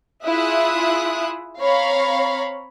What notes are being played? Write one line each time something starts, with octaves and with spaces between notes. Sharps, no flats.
E4 F4 G#4 E5 D#6 F#6
C4 C#5 F5 A#5 B5